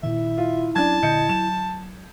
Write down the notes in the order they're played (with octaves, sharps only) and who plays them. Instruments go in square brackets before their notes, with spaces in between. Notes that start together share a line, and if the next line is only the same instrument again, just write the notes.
[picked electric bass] A#2 D#3 [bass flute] E4 [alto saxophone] E5
[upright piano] F4
[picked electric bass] F#3 C#4 [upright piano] D4 G#6 [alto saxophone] A5
[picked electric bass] A#2 D3 [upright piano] D#5 G6 C#7
[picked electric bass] F#3 [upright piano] E7